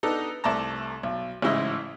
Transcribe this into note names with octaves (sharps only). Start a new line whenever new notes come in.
B3 D4 D#4 A4
C2 A3 D5 A5 A#5
B1
A1 G#2 C#3 E4 D#5 E5